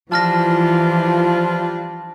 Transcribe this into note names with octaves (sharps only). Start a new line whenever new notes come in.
E3 F3 G3 D4 F4 A5 F6 A#6